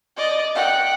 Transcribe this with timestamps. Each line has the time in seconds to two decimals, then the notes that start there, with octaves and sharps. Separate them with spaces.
0.17 D5 D#5
0.55 F#5 G5